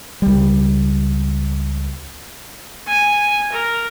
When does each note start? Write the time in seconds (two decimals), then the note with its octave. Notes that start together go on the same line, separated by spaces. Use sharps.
0.22 C#2 G3
2.88 G#5
3.52 A#4